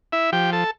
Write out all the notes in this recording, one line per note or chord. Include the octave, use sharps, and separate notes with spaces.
E4 E5
F3 G4 G5
A4 A5